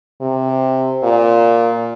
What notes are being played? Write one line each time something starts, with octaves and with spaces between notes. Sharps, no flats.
C3
A#2